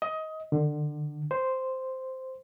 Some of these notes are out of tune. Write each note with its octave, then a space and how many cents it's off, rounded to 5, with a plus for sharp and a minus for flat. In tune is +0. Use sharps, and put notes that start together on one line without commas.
D#5 +20
D3 +25
C5 -5